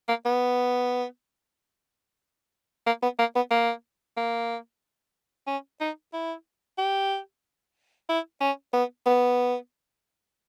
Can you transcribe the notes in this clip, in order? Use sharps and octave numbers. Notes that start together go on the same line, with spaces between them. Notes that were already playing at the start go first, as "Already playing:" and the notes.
A#3
B3
A#3
B3
A#3
B3
A#3
A#3
C#4
D#4
E4
G4
E4
C#4
B3
B3